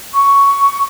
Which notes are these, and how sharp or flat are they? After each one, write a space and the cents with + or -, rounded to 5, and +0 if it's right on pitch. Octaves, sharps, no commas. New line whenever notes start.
C#6 +10